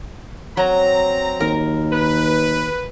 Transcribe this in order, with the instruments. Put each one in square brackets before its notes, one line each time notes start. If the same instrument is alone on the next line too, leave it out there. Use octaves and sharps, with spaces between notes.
[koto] F#3 [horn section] C4 A#5
[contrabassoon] D#2 [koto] A#4
[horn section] B4